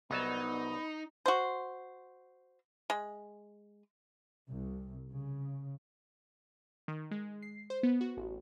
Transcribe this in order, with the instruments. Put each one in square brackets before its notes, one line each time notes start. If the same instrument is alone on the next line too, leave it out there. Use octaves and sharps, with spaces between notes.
[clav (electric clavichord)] C2 F#3 A5 [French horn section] B3 [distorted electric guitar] D#4 [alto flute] B5
[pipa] F#4 C5
G#3
[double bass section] C2
C#3
[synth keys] D#3
G#3
C7
C5
B3
F#4
A1